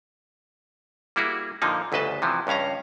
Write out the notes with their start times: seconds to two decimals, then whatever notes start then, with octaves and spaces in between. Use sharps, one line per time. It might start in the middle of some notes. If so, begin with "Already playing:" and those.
1.16 G3 A#3 E4 F#4 G#4
1.62 A#2 D3 F3 A#3 D#4
1.92 G1 D2 C#3 B4 D#5 A5
2.22 C3 E3 F3
2.47 C#2 G2 C#4 F5 A#5